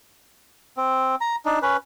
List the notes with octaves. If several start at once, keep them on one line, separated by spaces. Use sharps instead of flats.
C4
A#5
D4 D#4
C#4 B4